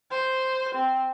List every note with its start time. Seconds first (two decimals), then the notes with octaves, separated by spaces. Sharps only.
0.11 C5
0.75 C4